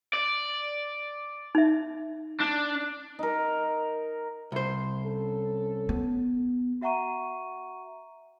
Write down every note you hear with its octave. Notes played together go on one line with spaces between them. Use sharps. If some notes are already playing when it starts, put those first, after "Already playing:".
D5
D#4 E5
D4
D#4 A#4
C2 C5
C#4 A4
B3
F#4 E5 F#5 A#5 C#6 D#7